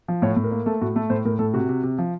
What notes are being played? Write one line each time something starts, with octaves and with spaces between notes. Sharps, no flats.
F3
A2 C#5
A2
A#4
A#3
A3 A4
A2 F#4
A3 A4
A2 C5
A2 A#4
A2 A4
C3 F#4
C3
C3
F3